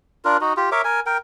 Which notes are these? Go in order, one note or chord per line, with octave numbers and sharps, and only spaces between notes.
D4 F4 A#4
D#4 F#4
F4 G4
A#4 C#5 E5 D6
A#4 G#5
A#4 G5